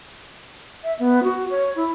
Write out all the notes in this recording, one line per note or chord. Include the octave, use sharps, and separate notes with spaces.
E5
B3
F#4
C#5
E4